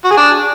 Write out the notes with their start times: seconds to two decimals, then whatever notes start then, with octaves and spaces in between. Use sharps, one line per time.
0.05 F#4
0.11 G#4
0.17 D4